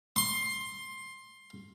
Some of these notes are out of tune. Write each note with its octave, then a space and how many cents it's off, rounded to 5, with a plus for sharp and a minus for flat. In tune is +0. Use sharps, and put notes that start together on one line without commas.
C6 +15